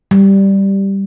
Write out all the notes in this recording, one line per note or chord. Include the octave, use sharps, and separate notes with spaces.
G3